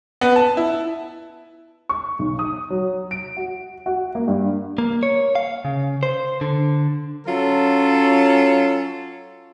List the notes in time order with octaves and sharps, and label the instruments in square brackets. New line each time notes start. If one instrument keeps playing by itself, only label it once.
[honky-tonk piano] B3
A5
E4
C#6
B1
D#6
F#3
D7
F#4
F#4
A#3
G2
[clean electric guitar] A#3
C#5
F5
C#3
C5
D3
[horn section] F#3 C#4 F4 A4